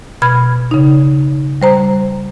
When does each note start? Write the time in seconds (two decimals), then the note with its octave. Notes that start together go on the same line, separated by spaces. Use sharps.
0.22 B2 B5 F6 G#6
0.71 C#3 D#4
1.62 G3 C5 A#5